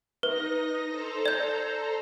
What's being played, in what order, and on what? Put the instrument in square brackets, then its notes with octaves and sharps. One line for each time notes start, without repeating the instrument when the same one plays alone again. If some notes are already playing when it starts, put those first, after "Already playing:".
[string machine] D#4 D#5 A#6 [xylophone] B4
[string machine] A4 C5 A#5
[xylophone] D5 G6